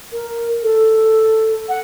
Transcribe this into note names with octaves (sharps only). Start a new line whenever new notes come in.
A#4
A4
F#5